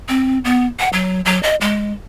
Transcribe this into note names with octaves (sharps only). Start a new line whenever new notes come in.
C4
B3
F#5
F#3
F#3
D#5
G#3